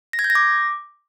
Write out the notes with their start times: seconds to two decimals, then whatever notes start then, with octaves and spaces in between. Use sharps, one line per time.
0.13 A#6
0.19 G#6
0.24 G6
0.30 A#6
0.35 D6